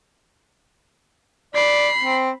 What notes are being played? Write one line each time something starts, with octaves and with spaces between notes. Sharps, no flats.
D5 B5 C7
C4